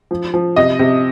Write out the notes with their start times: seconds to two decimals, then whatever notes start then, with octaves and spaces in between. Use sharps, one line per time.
0.11 F3
0.34 F3
0.56 C3 D#5
0.79 C3